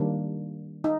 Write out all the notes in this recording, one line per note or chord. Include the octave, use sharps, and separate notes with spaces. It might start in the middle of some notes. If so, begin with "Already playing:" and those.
Already playing: D#3 G3 A#3 D4
D#4